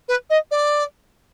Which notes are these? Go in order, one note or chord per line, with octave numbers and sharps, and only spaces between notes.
B4
D#5
D5